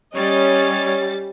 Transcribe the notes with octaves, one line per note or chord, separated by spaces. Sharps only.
G3 C#4 C#5 D#5 A6